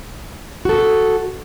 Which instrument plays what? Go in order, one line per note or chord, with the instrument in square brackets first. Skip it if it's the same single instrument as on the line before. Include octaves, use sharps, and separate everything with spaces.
[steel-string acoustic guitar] F#4 A4